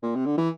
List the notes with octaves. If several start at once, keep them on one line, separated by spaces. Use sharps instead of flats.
A#2
C3
D3
E3